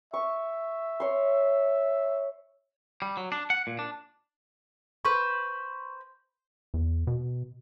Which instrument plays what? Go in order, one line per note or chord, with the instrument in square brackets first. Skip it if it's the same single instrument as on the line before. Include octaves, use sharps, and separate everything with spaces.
[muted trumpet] E5 [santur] C#6
[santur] C#5 C6
[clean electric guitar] G3
F#3
D4
F#5
A#2
D4
[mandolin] B4 C5 [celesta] C#6
[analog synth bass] E2
B2